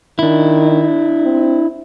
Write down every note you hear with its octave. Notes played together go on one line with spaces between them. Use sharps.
D#3 D4 E4
C4